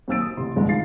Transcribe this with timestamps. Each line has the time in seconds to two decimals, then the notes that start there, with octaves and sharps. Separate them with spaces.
0.08 D#2 F#3 C4 E6 A6 D7
0.22 D#6
0.37 A1 C3 C6
0.56 G1 C2 E3 G#3 A3
0.69 D#3 F4 F5 A6 C7